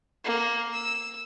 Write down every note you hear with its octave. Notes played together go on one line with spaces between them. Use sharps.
A#3
E6